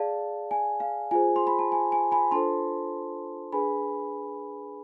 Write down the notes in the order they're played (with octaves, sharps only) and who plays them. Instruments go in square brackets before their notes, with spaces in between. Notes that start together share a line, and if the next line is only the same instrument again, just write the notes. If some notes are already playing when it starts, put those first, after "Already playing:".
Already playing: [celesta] G#4 D5 F5 A5
G#5
F5
F4 G#4 C5 G#5
C6
B5
A5
G#5
G#5
G#5 B5
D4 F4 A4 C5 A5 C6
D4 G#4 B4 G#5 B5